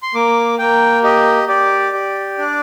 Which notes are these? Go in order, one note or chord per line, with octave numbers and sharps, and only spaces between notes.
C6
A#3 D6
A#3 G5
G4 D#5
G4 D5
G4
D4